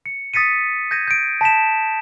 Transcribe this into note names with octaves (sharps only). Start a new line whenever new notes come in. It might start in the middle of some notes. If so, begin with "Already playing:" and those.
C#7
D#6 A6 B6 C#7 D#7
G6 G#6 A#6 D#7
G6 D7
A5 B6 E7